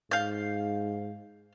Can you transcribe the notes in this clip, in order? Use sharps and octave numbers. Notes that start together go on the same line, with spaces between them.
G#2 F5 G6